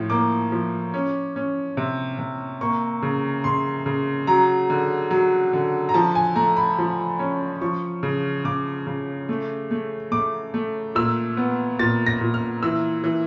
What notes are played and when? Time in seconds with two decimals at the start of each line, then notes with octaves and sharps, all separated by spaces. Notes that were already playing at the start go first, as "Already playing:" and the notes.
Already playing: A2 F3
0.10 A#3 D6
0.52 F3
0.94 C#4
1.36 C#4
1.77 C3
2.19 C3
2.61 A#3 C#6
3.02 C#3
3.44 C#3 C6
3.86 C#3
4.27 F#3 A#5
4.70 D3
5.11 F#3
5.53 D3
5.89 A#5
5.94 F3 A5
6.15 G#5
6.36 A3 A#5
6.57 B5
6.78 F3
7.19 C#4
7.61 F3 C#6
8.03 C#3
8.44 C#3 D6
8.87 C#3
9.29 A3
9.71 A3
10.12 A3 D6
10.54 A3
10.95 A#2 E6
11.37 B3
11.79 A#2 A6
12.07 A#6
12.21 A#2
12.34 F6
12.63 E3 E6
13.04 E3